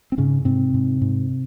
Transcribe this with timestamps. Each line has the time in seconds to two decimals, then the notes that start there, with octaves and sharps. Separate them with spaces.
0.12 C4
0.18 G#2 C#3 C#4
0.45 G#2 C3 C4
0.74 G#2
1.01 G#2